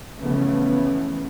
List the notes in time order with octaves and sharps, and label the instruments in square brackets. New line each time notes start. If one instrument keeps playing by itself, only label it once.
[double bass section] C#3 E3 F3 A3 B3